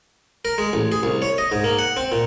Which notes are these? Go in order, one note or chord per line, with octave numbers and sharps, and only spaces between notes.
A#4
G#3
A1
G#4
C2
C#5
D#5
G#2
A#3
F#5
C4
A#2